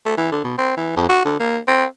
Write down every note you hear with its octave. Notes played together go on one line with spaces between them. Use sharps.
A3
E3
D3
B2
C4
E3
F2
F#4
D3
A#3
C4